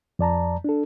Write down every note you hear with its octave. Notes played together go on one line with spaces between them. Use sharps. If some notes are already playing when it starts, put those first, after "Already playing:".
F2 D5 A5 A#5
D4 A4